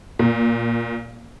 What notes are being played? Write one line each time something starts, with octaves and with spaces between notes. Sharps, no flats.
A#2